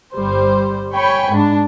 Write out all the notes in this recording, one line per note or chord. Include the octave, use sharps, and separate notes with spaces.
G1 G3 C5
C#5 G5 G#5 B5 C#6
G#2 D4